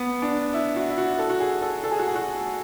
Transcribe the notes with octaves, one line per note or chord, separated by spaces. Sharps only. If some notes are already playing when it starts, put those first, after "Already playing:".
Already playing: B3
D4
E4
F#4
E4
F#4
A4
F#4
G#4
A4
A4
G#4
F#4
G#4
F#4